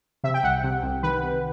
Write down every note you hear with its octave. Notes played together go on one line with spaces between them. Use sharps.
C3 E5
G5
C2 F#5
C3
C2
D#3 B4
C3